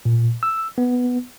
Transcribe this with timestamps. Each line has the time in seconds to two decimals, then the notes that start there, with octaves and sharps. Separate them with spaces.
0.05 A#2
0.43 E6
0.78 B3